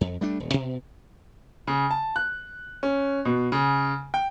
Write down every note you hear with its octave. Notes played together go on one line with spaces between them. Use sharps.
F2
G3 A3 D4
D#1
B2
C#3
A5
F#6
C#4
B2
C#3
G5